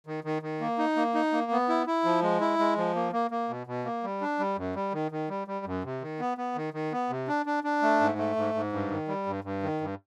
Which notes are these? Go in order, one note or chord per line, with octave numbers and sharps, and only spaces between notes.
D#3
D#3
D#3
A#3
D#4
A#3
D#4
A#3
B3
E4
E4
F3
G#3
E4
G#3
F3
A#3
A#3
A#3
B2
B2
A#3
G3
D4
G3
F#2
G3
D#3
D#3
G3
G3
F#2
C3
D#3
B3
B3
D#3
D#3
B3
C3
D4
D4
D4
A3
G#2
A3
G#2
G#2
G2
D#3
G3
G2
G2
D#3
G2